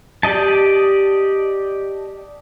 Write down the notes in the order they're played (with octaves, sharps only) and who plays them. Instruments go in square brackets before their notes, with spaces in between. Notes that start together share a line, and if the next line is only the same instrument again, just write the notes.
[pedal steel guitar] G4 D5 D#5 A5